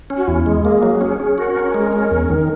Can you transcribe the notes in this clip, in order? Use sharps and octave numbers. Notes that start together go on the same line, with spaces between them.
C#4
F#4
E2 E4
G#3
A#3 G#4
F#3
C#4
C#4
F#4 A#4
C#4
G#3
C#4
E2
D#3